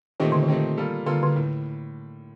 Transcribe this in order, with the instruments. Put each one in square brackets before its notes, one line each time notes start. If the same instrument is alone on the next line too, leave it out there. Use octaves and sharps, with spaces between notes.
[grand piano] A#2 A3 C4 D#4 G4 [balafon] D#3
[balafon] D3
D#3
[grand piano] A#2 A3 C4 D#4 G4
G3 A#3 F4 A4
[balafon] D3 [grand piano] G3 A#3 F4 A4
[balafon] D3
[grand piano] A2